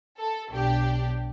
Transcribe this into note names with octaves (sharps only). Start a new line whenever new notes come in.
A4
B1 D4 G4